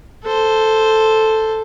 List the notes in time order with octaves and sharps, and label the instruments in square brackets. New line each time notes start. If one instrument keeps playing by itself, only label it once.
[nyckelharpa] A4 C5